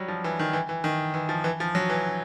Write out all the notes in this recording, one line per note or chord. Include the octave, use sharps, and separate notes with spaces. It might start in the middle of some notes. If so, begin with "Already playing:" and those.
Already playing: F#3 G3
F3
E3
D#3
E3
E3
D#3
E3
F3
E3
F3
F#3
E3